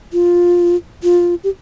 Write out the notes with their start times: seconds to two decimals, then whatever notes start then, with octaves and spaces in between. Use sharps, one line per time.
0.13 F4
1.03 F4
1.44 G4